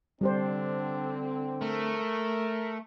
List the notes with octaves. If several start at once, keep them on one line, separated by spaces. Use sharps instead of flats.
D3 G3 C4 D4 G4 C5
A3 A#4